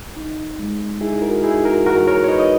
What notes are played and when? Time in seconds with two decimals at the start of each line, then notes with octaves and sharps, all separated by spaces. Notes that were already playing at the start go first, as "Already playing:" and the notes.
0.16 D#4
0.59 G#3
1.01 D#4 E4 G#4
1.22 F#4 A#4
1.43 D#4 E4 G#4
1.64 F#4 A#4
1.86 E2 F#4 A#4
2.08 A#4 C#5
2.24 C#5
2.28 D#4 B4 D#5
2.39 D#5